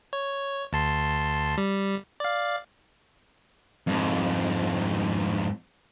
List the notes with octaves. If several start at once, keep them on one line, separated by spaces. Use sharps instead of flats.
C#5
D2 A5 C6
G3
D5 F5
F2 G#2